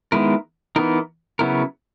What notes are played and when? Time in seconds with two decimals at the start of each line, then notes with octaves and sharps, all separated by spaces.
0.12 D#3 G#3 B3 E4 A#4
0.76 E3 B3 D#4 A#4
1.39 C#3 F#3 B3 E4 A#4